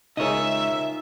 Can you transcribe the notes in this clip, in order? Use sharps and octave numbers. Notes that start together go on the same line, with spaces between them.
C#2 D#4 F4 G#4 A#4 C#5 D#5 E5